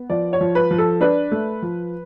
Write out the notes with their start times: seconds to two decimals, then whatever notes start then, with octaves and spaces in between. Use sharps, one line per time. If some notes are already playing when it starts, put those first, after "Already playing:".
Already playing: B3
0.10 F3 D5
0.33 C#5
0.41 F3
0.55 B4
0.71 F3
0.78 A4
1.01 D4 B4
1.32 A3
1.62 F3